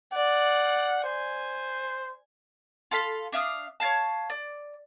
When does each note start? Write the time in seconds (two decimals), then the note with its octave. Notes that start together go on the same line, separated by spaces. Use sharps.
0.13 D5 F#5
1.04 C5 G#5
2.91 F4 A4 F5 B5
3.32 D4 E5 F5 D#6
3.80 C#5 D5 F5 A5
4.30 D5